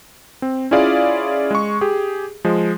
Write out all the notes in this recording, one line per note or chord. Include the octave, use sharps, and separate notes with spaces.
C4
C#4 E4 F4 G#4 D5 F5
G#3 C#6
G4 G#4
F3 G#3